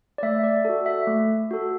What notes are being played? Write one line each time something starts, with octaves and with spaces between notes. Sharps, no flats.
D5
A3 E5
D5
F#4 A4
E5
A3
F#4 A4